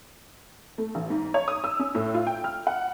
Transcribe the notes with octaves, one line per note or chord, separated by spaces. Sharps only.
A3
A1
G#2
C#5
D#6
E6
C#4
A2
F4
G5
F6
F#5